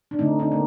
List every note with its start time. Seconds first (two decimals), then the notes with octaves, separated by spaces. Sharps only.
0.11 D4
0.19 D3 A3 C4 D#4
0.39 C4 D#4
0.52 A#3